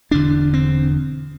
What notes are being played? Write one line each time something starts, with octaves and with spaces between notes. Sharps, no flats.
E1 E2 D3 D4
C4